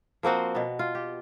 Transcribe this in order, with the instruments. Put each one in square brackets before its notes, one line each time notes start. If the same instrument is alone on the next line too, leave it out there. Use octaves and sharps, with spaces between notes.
[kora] F3 A#3 C4 F#4
B2 B3
F4
G4